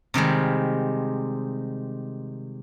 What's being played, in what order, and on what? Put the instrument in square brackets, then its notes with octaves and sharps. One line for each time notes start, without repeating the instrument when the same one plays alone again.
[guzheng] C3 D#3 G3 G#3